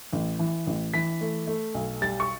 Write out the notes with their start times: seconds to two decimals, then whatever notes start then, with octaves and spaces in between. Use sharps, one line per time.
0.13 A1
0.39 E3
0.67 A1
0.94 E3 B6
1.21 A3
1.47 A3
1.74 B1
2.02 G3 A6
2.20 C#6